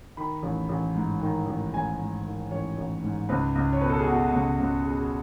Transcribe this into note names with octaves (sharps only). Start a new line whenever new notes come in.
D#3 B5
A1
A1
G#2
D#3
A1
A1 G#5
G#2
D#3
A1 C#5
A1
G#2
C#2 B4
C#2
C#5
B2 B4
A4
G#4
B2 F#4
C#2
C#2
B2 G#4
G#4